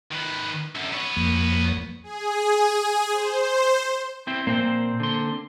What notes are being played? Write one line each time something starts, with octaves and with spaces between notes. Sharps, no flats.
D#3 B4
F#2 D3
B3 C#5
F2 F3 A#3
G#4
C5
C4 E4 C5
A#2 A#3 C4 C5 G5
D3 C6